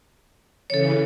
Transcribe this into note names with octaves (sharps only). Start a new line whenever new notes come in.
C#3 E3 A4 C#5